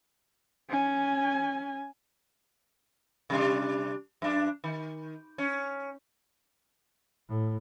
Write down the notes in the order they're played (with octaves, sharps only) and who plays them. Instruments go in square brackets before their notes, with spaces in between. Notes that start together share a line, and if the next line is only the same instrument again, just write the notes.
[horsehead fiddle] C#4 G#5
[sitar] C3 G3 D4
F#2 D4
D#3
C#4
[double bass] A2